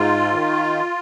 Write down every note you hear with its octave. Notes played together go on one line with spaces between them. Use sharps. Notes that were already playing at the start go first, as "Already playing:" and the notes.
Already playing: G#2 F4
D#3